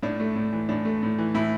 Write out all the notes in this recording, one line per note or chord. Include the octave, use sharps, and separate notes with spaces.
A2 D4
A3
A2
E3
A2 D4
A3
A2
E3
A2 E4